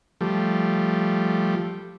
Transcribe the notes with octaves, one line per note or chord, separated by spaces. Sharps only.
F3 G3 A3